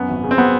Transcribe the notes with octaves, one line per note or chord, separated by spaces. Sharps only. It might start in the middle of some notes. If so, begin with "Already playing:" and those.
Already playing: F#2 B3
G#1
C#3
C4
B3